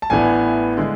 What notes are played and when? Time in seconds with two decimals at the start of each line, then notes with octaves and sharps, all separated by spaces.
0.02 A5
0.10 A1 A2 E3 B3 D4 G#5
0.77 D3 G#3